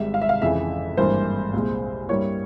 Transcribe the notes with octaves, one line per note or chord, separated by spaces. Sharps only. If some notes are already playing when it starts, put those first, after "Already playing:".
Already playing: G#1 G#2 G3 E5
F5
E5
F5
F2 C#3 E3 E5
G#1 G2 E3 A#3 C5
C2 A#2 G#3
G2 G3 A#3 E4 C#5